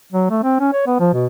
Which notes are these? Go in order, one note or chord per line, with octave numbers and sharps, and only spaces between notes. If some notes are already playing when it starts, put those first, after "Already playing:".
F#3
A3
C4
C#4
C#5
B3
F3
B2